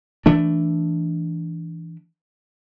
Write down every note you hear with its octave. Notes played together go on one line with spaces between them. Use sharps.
E3 A3 D4